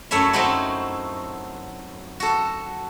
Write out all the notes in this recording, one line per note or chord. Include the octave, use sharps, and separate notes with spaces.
F#2 A3 E4 C#5 E5
F#3 A3 C4 D#4 E4 F#4
F#4 A4